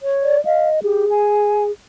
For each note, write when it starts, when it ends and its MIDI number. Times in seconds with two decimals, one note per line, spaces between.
0.02 0.37 73
0.23 0.43 74
0.45 0.80 75
0.45 0.68 77
0.83 1.05 67
0.83 1.72 68
1.10 1.63 80